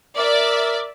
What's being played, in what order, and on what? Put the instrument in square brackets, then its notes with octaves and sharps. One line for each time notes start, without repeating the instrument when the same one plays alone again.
[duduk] A#4 [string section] D5 E5